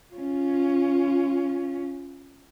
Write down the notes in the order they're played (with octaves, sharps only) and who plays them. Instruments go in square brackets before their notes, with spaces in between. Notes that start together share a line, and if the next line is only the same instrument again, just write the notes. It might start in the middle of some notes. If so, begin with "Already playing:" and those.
[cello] C#4 F4